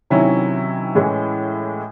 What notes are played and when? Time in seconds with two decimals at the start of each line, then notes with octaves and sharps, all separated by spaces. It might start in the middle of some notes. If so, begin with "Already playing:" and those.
0.10 C3 D#3 F#3 C#4 E4
0.95 A2 E3 G#3 C#4 E4